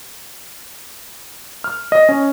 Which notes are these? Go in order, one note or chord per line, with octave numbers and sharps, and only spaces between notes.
F6
D#5
C#4